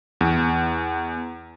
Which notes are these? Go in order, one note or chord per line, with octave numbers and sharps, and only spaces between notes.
E2